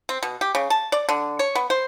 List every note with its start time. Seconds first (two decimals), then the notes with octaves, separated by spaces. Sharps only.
0.09 C4
0.23 B2
0.41 G4
0.55 C#3
0.70 A5
0.92 D5
1.09 D3
1.39 C#5
1.55 B3
1.70 C5